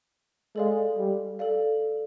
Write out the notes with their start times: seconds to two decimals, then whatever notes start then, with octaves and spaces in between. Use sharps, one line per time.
0.56 G#3 A4 D5 F5
0.97 G3
1.39 A4 D5 F5